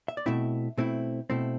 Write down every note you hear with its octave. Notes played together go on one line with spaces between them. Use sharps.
E5
D5
B2 A3 C4 E4 E5
B2 A3 C4 E4
B2 A3 C4 E4